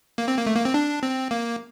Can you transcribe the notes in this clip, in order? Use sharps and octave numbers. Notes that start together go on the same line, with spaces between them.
A#3
C4
A#3
A3
A#3
C4
D4
C4
A#3